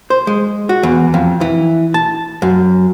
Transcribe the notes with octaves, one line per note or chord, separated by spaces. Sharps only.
C5
G#3
F#4
E2
F2
E3
A5
F#2